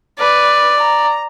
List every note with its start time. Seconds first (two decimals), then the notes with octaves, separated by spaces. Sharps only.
0.19 B4 D5
0.79 A#5